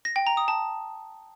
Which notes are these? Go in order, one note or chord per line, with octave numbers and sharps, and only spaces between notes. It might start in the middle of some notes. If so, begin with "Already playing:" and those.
A#6
G5
A#5
D#6
A5